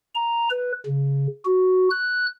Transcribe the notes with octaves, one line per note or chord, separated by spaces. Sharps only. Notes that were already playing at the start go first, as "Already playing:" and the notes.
A#5
B4
C#3
F#4
F#6